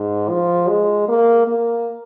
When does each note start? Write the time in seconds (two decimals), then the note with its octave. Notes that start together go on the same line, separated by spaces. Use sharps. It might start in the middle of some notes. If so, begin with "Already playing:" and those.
Already playing: G#2
0.30 F3
0.68 G#3
1.08 A#3
1.47 A#3